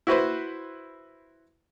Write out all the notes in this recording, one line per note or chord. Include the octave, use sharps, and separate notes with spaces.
E4 F#4 B4 C5